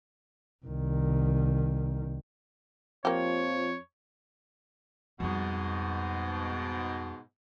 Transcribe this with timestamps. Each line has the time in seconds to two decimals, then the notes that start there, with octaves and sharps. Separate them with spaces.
0.65 C2 D#3
3.05 F2 F3 A#3 G4 C#5
5.20 F2 G#2 B2 G3